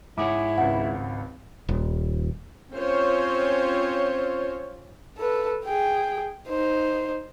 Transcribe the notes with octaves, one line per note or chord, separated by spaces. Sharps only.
G#2 E4 G#4 C#5 F#5 D6
G#1 C#2 F#5
D#1
C4 C#4 F4 C5 C#5
A4 B4
G#4 G5
D#4 C5